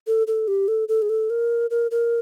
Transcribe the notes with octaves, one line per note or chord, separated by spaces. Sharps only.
A4
A4
G4
A4
A4
G#4
A4
A#4
A#4
A#4